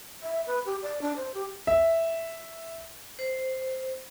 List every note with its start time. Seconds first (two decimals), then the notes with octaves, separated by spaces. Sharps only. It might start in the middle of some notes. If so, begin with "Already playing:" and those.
0.23 E5
0.47 B4
0.66 G4
0.82 D5
1.02 D4
1.16 C5
1.34 G4
1.67 E5
3.19 C5